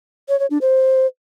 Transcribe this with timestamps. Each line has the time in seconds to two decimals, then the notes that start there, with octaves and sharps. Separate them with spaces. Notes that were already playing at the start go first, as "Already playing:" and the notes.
0.29 C#5
0.39 C#5
0.50 D4
0.61 C5